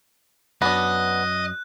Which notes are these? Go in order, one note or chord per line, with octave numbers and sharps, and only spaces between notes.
F#2 B3 D4 D#5 F#6